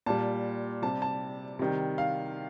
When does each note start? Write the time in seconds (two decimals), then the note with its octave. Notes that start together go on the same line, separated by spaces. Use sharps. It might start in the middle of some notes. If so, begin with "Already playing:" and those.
0.06 A#2 G3 A5
0.82 C3 G3 A5
1.02 A5
1.59 C3 D#3 G3
1.98 F5